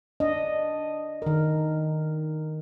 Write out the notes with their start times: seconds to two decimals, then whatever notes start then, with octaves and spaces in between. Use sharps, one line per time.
0.20 D4 D#5
1.22 D#3 A#4